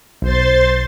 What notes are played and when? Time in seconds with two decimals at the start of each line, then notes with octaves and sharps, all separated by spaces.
0.22 B1 C5 C6 A6